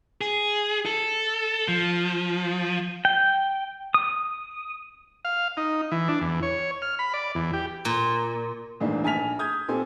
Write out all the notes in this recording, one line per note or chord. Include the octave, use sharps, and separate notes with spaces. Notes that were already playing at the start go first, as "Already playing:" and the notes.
G#4
A4
F3
G5
D#6
F5
D#4
E3
D4
E2
C#5
F6
B5
D5
E2
G4
A#2
D#1 G#1 A2 E3 A#3 D4
A#1 G#5 A5 F6 B6 F7
D#6 G6 G#6
A#2 C4 G4 A4 G#5